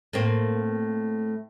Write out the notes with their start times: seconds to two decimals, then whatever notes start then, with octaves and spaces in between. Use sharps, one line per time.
0.13 A2 A#3 C4